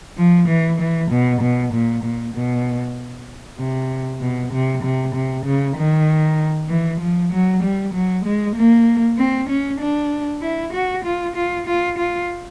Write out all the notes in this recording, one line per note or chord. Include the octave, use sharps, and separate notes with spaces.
F3
E3
E3
B2
B2
A#2
A#2
B2
C3
B2
C3
C3
C3
C#3
D#3
E3
F3
F#3
G3
F#3
G#3
A#3
C4
C#4
D4
E4
F#4
F4
F4
F4
F4